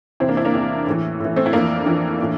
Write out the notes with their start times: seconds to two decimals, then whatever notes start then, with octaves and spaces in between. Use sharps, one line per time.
0.20 E2 C3 E3 C4 E4
0.29 A#3 D4
0.37 C4 E4
0.45 A#3 D4
0.54 E2 C3 E3
0.87 A2 E3
1.20 A2 E3
1.36 A3 C4
1.46 E4
1.53 F2 E3 A#3 D4
1.86 F2 E3
2.19 A2 E3